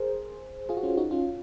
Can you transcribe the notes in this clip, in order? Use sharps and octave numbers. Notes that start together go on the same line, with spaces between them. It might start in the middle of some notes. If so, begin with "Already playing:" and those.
Already playing: G#4 A#4 C5
F4 G#4
F#4
C#4 F4
D#4 F#4
C#4 F4